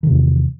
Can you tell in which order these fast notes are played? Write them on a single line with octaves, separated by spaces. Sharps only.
D#3 C3 E2